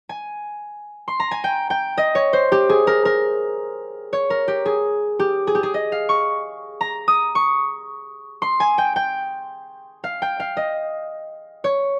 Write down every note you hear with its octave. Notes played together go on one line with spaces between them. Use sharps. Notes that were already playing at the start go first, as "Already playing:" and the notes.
G#5
C6
A#5
G#5
G5
G5
D#5
C#5
C5
G4
G#4
A#4
A#4
C#5
A#4
G4
G#4
G4
G#4
G4
G#4
D#5
F5
C#6
A#5
D#6
C#6
C6
G#5
G5
G5
F5
G5
F5
D#5
C#5